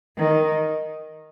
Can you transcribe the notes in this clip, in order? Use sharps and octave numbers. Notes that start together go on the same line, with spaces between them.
D#3